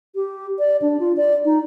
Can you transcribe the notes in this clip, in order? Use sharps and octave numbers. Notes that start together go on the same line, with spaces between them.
G4
D5
D4
F4
D5
D#4